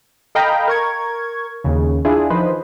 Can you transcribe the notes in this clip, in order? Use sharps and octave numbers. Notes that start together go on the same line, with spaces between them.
A4 D#5 F5 G5 A#5 B5
A#4 C#6 G#6
D#2 C#3
D4 E4 F4 G#4
D#3 F3 B4 C5 D#5